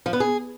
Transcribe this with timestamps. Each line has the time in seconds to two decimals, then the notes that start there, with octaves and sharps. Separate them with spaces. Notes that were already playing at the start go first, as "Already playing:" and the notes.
0.06 F3
0.13 B3
0.20 G#4